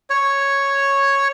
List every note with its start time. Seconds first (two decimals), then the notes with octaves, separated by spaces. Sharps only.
0.10 C#5